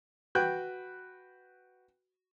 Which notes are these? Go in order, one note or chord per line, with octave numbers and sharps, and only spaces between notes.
F#4 B4 G5 F#6